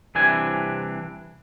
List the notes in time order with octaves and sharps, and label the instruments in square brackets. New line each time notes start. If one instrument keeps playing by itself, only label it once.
[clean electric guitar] C2 C3 E3 D4 G#5